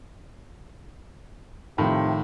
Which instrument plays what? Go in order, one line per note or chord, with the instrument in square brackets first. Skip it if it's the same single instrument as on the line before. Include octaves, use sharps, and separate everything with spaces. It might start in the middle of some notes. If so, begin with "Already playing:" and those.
[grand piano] A2 D#3 F3 [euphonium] C3